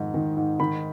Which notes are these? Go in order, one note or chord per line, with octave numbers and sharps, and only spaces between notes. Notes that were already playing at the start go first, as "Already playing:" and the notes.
Already playing: F2 G#2 D#3
D#3
G#2
D#3 B5